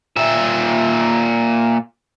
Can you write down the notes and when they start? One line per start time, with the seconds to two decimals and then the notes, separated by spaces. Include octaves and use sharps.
0.17 A#2 E5